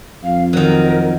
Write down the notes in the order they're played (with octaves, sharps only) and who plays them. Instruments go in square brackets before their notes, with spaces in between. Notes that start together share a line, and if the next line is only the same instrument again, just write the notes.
[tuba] F2 [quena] F5
[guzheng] D#3 F#3 [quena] A#4